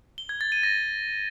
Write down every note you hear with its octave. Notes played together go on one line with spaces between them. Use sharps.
G7
G#6
A6
D#7
A#6